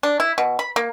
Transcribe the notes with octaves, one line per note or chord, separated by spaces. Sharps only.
D4
E4
B2
B5
A#3